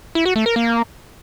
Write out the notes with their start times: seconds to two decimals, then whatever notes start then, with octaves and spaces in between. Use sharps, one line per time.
0.15 E4
0.25 F#4
0.36 A3
0.46 A#4
0.56 A#3